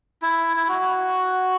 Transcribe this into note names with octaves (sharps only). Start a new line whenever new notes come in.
E4
E4
F#4